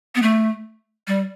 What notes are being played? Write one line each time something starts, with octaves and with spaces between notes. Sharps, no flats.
B3
A3
G3